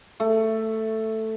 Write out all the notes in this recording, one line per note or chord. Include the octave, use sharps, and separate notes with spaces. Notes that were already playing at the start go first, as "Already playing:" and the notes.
A3